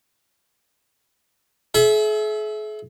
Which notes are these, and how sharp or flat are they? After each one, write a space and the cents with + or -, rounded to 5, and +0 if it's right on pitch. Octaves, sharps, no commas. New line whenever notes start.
G#4 +45 E5 -5